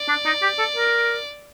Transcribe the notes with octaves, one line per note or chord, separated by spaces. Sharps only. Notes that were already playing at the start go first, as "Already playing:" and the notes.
Already playing: D5
D4
D#4
G4
A4
A#4